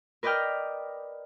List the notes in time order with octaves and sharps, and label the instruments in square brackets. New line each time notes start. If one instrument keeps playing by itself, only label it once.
[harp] A#4 B4 D5 D#5 G5 F6